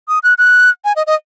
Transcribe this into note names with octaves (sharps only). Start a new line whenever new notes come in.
D#6
F#6
F#6
G#5
D#5
D#5